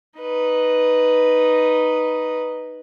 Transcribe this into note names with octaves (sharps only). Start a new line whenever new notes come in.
D#4 B4